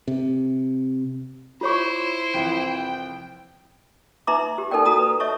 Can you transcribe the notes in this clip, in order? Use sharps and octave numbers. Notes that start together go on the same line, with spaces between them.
C3
E4 F4 C5 C#5 C#6
C2 F2 E3 G5
D#4 B4 E5 A#5 C6 D6
G4
D#4 A4 A#4 D5 G5
F#4 A4 A#5 D#6
B4
C#5 D#5 E5 A5 C#6